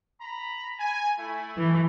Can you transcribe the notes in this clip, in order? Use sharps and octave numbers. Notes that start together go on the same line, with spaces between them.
A#5 B5
G#5
A3 E4
E3